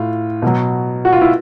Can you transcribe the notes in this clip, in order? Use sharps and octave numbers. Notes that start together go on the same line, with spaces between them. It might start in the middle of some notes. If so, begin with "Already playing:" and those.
Already playing: A2 F4
B2 F#3
F#4
F4
E4